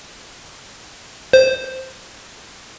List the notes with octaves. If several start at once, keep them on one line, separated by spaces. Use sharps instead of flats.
C5